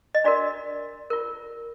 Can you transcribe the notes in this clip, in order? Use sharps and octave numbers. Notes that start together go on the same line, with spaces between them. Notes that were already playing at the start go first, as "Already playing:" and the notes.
D#5
D4 F#4 A#4 D5
F4 A#4